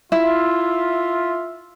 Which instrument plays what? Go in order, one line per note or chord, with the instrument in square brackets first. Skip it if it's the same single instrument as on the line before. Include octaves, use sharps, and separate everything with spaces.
[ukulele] E4 [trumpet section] F4 E5